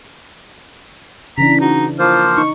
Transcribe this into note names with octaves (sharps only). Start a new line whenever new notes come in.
C#3 E3 D4 A#5 B6
D#4 F#4
F3 A#3 F4 C5 F6
D#4 C#6